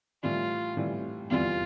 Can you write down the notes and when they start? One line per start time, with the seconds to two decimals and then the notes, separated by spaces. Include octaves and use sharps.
0.22 A2 E3 G3 F4
0.77 A2 E3 G3
1.30 F1 E2 C3 E3 G3 F4